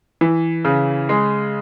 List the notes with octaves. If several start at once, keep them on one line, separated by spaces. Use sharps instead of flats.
E3
C#3
G#3